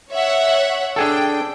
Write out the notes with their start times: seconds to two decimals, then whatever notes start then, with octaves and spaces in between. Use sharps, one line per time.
0.12 C#5 E5 F#5
0.96 D4 G#4 A4 G5